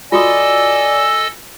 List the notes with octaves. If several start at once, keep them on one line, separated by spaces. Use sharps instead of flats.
F4 F#4 A4 D5 D#5 G#5 D#6 E6